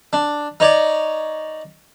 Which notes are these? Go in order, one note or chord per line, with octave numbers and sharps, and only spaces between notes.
D4
D#4 C#5 D5